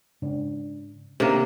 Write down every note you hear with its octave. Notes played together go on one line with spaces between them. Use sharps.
G#2 C#3 D4
C3 D#3 A#3 C#4 D4